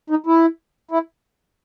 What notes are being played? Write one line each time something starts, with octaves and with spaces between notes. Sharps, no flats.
D#4
E4
E4